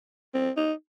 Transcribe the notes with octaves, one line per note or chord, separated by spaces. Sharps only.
C4
D#4